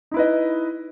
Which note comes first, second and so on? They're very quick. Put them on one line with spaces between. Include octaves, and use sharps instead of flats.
D#4 E4 B4 D#5